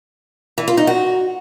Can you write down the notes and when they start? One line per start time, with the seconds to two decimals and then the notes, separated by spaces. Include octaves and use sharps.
0.58 E3
0.68 F4
0.77 D#4
0.87 F#4